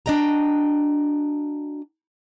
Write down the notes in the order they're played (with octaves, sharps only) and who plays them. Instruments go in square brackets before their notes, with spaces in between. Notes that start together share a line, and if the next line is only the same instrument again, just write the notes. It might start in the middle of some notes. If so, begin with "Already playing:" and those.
[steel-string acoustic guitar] D4 F#4 D#5 G5 A#5